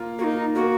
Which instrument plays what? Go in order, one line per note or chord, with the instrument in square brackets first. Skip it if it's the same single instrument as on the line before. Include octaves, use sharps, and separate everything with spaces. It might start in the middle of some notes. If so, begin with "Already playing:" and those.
Already playing: [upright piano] A#3 F4
[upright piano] A#3 [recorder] D#4 F#4
[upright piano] A#3 [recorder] F#4